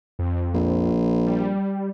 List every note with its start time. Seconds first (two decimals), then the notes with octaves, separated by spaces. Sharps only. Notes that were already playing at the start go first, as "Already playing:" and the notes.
0.19 F2
0.54 A#1
1.27 G3